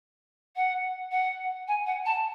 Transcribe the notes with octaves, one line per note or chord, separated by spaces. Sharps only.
F#5
F#5
G#5
F#5
A5